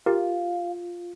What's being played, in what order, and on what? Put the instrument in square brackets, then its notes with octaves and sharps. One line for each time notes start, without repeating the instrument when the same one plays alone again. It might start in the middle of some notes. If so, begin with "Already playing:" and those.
[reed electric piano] F4 [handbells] G4 A#4 [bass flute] F5